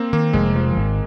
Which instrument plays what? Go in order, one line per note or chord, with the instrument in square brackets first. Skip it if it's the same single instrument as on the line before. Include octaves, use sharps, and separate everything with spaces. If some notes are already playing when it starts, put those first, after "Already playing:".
Already playing: [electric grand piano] A#3 C4
[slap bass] D#3 [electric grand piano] A#3
[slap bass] F1 [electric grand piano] G#3
[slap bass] F3
G#1